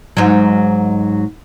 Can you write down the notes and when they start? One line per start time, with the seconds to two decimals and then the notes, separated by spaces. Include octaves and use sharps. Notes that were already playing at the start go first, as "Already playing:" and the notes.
0.17 G#2 F#3